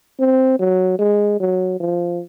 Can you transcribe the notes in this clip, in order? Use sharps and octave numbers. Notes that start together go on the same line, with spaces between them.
C4
F#3
G#3
F#3
F3